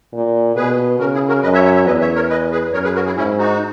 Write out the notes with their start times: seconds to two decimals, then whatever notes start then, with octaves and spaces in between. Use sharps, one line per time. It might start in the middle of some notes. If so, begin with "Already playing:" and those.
0.13 A#2
0.56 B2 G#4 B4
0.99 C#3 F#4 A#4
1.14 E4 G#4
1.28 F#4 A#4
1.42 F#2 B4 D#5
1.54 C#5 E5
1.65 C#5 E5
1.75 C#5 E5
1.86 E2 B4 D#5
2.01 C#5 E5
2.15 A#4 C#5
2.29 B4 D#5
2.52 G#4 B4
2.73 F#2 A#4 C#5
2.84 G#4 B4
2.95 F#4 A#4
3.06 E4 G#4
3.16 G#2 C#4 E4
3.39 D#4 F#4